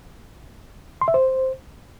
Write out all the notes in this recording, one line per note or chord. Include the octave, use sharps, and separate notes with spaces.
C6
E5
C5